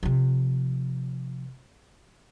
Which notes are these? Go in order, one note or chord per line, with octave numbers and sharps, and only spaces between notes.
C3 F3